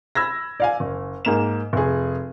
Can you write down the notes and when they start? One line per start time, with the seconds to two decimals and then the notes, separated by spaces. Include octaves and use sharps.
0.15 B5 E6 G#6 A#6
0.60 D5 F5 G#5
0.80 F#1
1.25 G#2 A#3 E7
1.73 F1 G#4